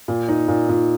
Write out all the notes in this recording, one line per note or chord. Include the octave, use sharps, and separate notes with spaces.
A#2
D#4
A#2
A#2